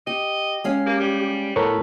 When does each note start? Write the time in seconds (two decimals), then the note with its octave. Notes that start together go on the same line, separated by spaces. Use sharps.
0.07 G4 D#5
0.64 G#3 C#4 F5
0.86 A#3 G4
1.00 G3
1.56 A2 B3 A4 A#4 C#5